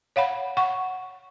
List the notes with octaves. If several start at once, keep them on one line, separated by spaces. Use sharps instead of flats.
C#5 F5 F#5 B5
F#5 C#6